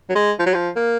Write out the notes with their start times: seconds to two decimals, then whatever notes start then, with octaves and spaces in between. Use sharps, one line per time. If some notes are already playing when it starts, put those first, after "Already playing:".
0.09 F#3
0.15 G#3
0.39 F3
0.46 F#3
0.54 F3
0.76 A#3